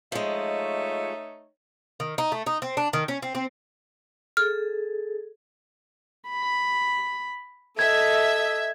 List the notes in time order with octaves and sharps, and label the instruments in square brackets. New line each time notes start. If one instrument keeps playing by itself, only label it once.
[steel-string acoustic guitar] F3 G#3 [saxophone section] A3 D#4 C#5
[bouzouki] D#3
D#4
A3
D#4
C4
D4
D#3
C#4
C4
C4
[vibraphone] G#4 A4 [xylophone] F6
[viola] B5
[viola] A4 D#5 [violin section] E5 [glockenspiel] G#6